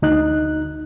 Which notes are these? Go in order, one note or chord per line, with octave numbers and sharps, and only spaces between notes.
D2 D#4 F#6